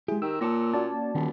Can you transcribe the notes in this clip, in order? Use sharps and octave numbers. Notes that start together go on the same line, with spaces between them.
G#3 E4 G4 G#4
D#3 G4 E6
A#2 A#4 C#5 A5
A#3 C#4 F#4 D5 A5
D#1 D#3